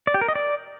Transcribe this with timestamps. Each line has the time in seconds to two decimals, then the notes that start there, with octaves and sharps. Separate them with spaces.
0.07 D5
0.14 G4
0.21 A#4
0.28 D#5
0.35 D5